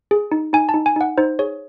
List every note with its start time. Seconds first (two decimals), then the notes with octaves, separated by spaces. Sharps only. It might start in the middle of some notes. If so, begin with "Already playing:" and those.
0.11 G#4
0.32 D#4
0.53 D#4 G#5
0.69 A5
0.74 D#4
0.86 G#5
0.96 D#4 F#5
1.18 D#4 C5
1.39 G#4 C#5